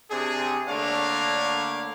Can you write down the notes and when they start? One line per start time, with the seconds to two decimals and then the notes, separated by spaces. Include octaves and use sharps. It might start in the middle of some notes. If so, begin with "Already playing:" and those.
0.11 C3 C4 D4 G#4
0.69 D3 A3 A#3 D4 C#5 F5